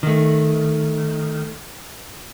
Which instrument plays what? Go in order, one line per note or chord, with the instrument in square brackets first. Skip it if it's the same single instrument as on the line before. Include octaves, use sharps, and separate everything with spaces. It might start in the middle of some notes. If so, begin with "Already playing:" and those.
[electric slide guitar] D#3 A3